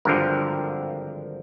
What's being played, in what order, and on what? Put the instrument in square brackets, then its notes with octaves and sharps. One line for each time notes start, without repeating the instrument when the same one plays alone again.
[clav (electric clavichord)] G#1 G2 D3 F3 A#4